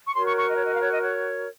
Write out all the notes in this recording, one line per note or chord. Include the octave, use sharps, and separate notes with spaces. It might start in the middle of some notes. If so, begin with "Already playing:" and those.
C#6
F#4 A#4 C#5 C6
C#6
C#6
D#5
C#5
D#5
F5
C#5
D#5
C#5